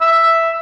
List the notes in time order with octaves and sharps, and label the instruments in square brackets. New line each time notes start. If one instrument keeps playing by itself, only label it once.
[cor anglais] E5